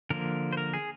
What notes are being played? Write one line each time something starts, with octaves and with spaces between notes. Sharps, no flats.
D3 F3 A#3 A#4
C5
A#4
G#4